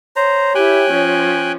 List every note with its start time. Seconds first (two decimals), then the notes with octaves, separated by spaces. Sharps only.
0.16 C5 C#5 A#5
0.55 E4 G4 G5 G#5 F#6
0.91 F3 C#4